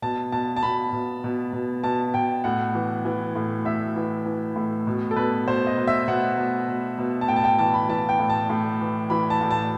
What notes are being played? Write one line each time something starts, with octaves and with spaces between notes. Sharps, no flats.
B2 A5
B2 A5
A5
B2 B5
B2
B2
B2
B2 A5
B2 G5
A2 F#5
E3
E3
A2
A2 E5
E3
E3
A2
B2
A4
B2 B4
B2 C5
D#5
B2
E5
B2 F#5
B2
B2
B2
A5
A2 G5
A5
G5
E3 A5
B5
E3 A5
G5
A2
A5
A2
E3
E3 B5
A5
A2
A5